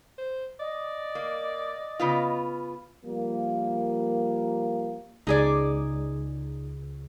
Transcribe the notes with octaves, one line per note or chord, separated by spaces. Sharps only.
C5
D5 D#5
A#3
C#3 B3 F4
F3 G3 A#3
C#2 D#4 G#4 D5